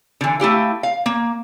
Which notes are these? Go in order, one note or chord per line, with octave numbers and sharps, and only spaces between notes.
D3 E3
A3 E4 G4 F5
F5
A#3